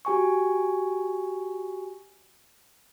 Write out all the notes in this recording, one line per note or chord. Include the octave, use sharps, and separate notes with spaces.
F#4 G4 G#5 C#6